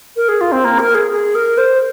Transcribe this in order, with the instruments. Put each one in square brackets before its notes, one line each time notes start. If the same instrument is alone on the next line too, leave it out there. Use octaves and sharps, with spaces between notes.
[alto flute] A#4
G#4
F4
C4
A#3
A#4
G#4
G#4
A#4
C5